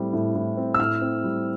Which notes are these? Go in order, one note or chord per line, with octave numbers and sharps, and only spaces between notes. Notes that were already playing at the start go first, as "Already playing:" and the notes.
Already playing: A2 G3 C4
A2
A2
C4
E6
A2 F6
C4
G3